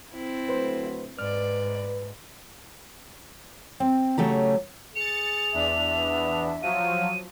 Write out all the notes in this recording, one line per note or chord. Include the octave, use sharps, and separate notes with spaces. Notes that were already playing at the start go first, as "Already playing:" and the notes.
C4 E4
D3 F#3 A3 B4 C5
G#2 B4 D5 F6
C4
C#3 F#3 A3 G4 A#5
G#4 A6 C#7 F7
E2 D4 E5
B3
F3 F#3 F5 D#7